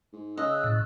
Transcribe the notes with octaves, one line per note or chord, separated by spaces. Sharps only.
G#2
C#3 D#5 E6 F#6
A2